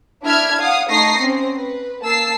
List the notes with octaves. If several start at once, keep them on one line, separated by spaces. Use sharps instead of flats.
D4 E4 E5 F6 G#6
F5 F#5 D#6
A3 D#4 C#6 D#6 A#6 C7
C4 C#4
B4
A#3 A5 E6 C7